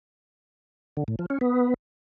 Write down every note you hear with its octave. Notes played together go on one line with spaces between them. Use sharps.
D3
A2
F3
C#4
B3